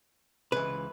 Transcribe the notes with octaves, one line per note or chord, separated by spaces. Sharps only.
C#2 C#3 E3 B4